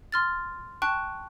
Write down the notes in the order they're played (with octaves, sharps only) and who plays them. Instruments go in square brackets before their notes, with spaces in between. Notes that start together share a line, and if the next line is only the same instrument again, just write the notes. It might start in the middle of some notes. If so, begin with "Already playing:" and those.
[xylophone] C6 F6 A6
G5 A5 C#6 F#6